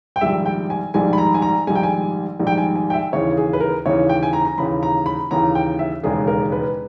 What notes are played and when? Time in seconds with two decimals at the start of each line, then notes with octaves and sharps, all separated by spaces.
0.16 G5
0.21 A#1 G#2 D#3 G3 E5
0.46 G5
0.70 G#5
0.94 A#1 G#2 D#3 G3 G#5
1.13 B5
1.18 A#5
1.34 G#5
1.42 A#5
1.67 A#1 G#2 D#3 G3 G#5
1.75 G5
1.83 G#5
2.39 A#1 G#2 D#3 G3
2.47 G5
2.58 G#5
2.76 G#5
2.90 G5
2.94 E5
3.12 D#2 C#3 E3 C#5
3.37 G#4
3.53 B4
3.60 A#4
3.86 D#2 C#3 E3 C#5
4.09 G5
4.23 G#5
4.33 A#5
4.45 A#5
4.58 D#2 C#3 E3 B5
4.83 A#5
5.06 B5
5.31 D#2 C#3 E3 A#5
5.55 G5
5.79 E5
6.03 E1 D#2 C#3 G#3 G#4
6.27 A#4
6.52 B4